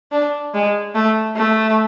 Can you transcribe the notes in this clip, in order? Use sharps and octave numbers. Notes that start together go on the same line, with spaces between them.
D4
G#3
A3
A3